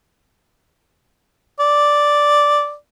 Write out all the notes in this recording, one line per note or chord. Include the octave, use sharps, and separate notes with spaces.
D5